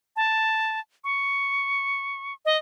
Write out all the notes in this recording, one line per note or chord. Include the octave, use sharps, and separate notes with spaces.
A5
C#6
D#5